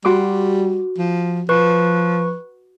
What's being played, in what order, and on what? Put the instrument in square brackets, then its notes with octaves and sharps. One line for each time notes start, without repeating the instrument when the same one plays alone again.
[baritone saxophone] G3 [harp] F#4 C6 D6
[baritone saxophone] F3
[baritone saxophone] F3 [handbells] B4 C#6